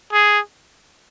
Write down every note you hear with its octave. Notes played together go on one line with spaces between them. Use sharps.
G#4